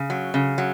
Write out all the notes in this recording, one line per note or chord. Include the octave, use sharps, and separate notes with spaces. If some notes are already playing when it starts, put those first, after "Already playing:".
Already playing: C#3
F#3
C#3
F#3